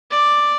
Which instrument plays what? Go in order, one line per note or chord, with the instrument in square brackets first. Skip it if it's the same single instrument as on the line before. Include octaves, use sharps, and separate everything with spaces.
[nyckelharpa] D5